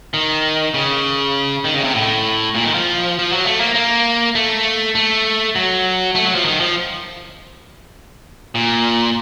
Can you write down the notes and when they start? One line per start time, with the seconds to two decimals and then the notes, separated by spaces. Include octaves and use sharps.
0.14 D#3
0.74 C#3
1.64 D#3
1.74 C#3
1.84 C3
1.94 A2
2.55 A#2
2.65 D#3
2.74 F3
3.19 F3
3.32 F#3
3.45 A3
3.60 A#3
3.75 A#3
4.35 A3
4.95 A3
5.55 F#3
6.15 A3
6.25 F#3
6.35 F3
6.45 D#3
6.60 F3
8.55 A#2